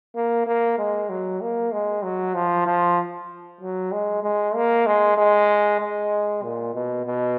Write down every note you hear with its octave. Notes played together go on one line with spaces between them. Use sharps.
A#3
A#3
G#3
F#3
A#3
G#3
F#3
F3
F3
F#3
G#3
G#3
A#3
G#3
G#3
G#3
A#2
B2
B2